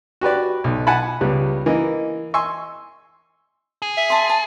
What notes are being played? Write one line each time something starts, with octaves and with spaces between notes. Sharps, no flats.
F#4 G4 B4 D5
B1
F#5 G#5 A5 B5
C#2 G3 B3
E3 A#3 D#5
G#5 C6 C#6 E6
G#4
E5
A5 C6
A5